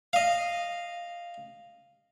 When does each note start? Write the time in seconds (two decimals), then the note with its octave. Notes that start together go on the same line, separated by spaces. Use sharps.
0.13 D#5 F5